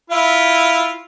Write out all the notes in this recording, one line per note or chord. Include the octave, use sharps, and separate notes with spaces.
E4 F4